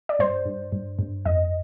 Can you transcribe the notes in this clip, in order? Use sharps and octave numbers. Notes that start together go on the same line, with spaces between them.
D5
G2 C5
G2
G2
G2
F2 D#5